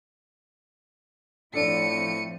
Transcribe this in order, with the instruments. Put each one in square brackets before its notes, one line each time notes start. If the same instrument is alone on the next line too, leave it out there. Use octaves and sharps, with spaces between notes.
[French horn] A2 [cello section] F3 C4 [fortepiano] D4 A4 [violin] C#7 D#7